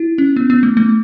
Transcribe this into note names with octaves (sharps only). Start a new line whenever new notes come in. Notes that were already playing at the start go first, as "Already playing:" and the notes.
Already playing: E4
C#4
B3
B3
A3
A3